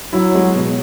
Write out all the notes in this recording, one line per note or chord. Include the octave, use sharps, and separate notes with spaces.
F#3 E4
G#3
B2